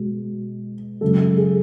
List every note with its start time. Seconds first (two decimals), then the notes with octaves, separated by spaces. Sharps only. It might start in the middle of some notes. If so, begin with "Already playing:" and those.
Already playing: B2 G#3
1.01 F#2 C#3 G#3 A4
1.37 G#4